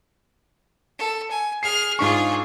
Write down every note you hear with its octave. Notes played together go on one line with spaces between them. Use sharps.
A4
G#5
G#4 F6 C7
G#2 D4 F4 G#4 C#6